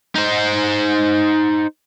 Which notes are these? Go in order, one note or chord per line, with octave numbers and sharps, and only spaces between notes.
D#4 C5